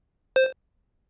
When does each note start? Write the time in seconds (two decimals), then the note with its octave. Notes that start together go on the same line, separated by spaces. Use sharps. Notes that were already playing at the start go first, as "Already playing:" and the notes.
0.36 C5